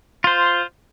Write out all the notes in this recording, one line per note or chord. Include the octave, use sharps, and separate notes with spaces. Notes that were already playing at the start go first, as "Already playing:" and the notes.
F4 C5